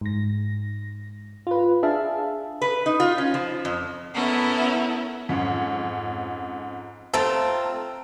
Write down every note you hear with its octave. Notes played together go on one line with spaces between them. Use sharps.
G#2 A#6
F4 B4
D4 G#4 E5 F5 A5
B4
D#4
F4
C#4
F3
F2
B3 C#4 E4 A4 A#4
F2 G#2 C#4
A3 C4 F4 A5 A#5 E6